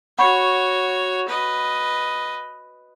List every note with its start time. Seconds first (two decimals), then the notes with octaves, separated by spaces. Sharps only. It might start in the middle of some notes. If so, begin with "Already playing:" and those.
0.19 F#4 C#5 F#5 B5 C#6
1.28 B4 D#5